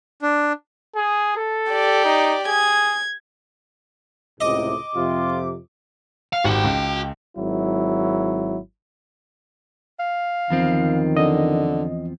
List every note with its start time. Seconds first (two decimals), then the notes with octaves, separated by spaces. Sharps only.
0.22 D4
0.96 G#4
1.37 A4
1.71 G4 D5
2.05 D#4
2.48 G#4 G#6
4.41 C#2 A2 C3 D#5 D6
4.96 F2 C3 F4
6.33 F5
6.44 G#1 F#4 G4 G5
6.64 C#2
7.37 G#1 F#3 E4
9.99 F5
10.50 E2 D#3 F3 C4
11.17 D3 D#5